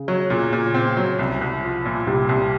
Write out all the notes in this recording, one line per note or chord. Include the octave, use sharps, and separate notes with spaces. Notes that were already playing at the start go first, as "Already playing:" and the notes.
Already playing: C#3
F#3
A#2 C#3
A#2
C4
F#3
C2
C2
F3
A#2
C2 C3
C2